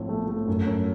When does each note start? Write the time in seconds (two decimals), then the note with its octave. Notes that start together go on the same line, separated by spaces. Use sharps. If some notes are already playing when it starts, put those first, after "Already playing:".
Already playing: A#1 A2 C4
0.09 A3
0.28 A3
0.48 F#2
0.67 F#2